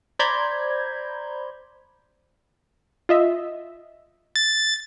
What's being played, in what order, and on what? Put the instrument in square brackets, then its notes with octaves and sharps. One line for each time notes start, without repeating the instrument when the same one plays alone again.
[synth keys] C5 D5 A#5 B5 G6 G#6
[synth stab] F4 D#5 E5
[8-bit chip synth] A6